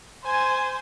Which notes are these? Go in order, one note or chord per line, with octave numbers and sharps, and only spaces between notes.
C5 G#5